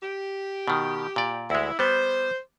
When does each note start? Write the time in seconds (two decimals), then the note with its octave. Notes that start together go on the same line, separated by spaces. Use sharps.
0.03 G4
0.68 B2 D#3
1.16 A#2 D5
1.50 D2 G#3 E4
1.79 G3 B3 C5